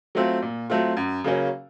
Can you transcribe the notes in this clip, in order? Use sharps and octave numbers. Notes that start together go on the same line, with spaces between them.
F#3 A3 C4 F4
A#2
F#3 A3 C4 F4
F#2
C#3 F#3 A#3 C#4